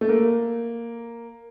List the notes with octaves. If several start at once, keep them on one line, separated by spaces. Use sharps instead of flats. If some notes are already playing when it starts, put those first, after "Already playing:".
A3
A#3